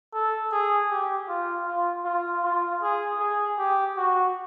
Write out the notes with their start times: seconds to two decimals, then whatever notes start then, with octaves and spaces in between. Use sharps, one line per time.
0.14 A4
0.51 G#4
0.90 G4
1.29 F4
1.66 F4
2.05 F4
2.44 F4
2.82 G#4
3.20 G#4
3.58 G4
3.97 F#4